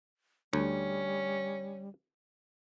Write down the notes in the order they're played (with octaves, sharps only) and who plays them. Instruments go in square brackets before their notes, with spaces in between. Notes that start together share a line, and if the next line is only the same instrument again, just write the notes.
[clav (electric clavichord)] D2 [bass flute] G3 [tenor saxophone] C#4